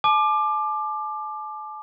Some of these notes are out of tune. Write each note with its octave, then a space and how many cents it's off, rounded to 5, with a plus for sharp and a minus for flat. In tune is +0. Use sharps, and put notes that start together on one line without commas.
A5 -40 D6 +20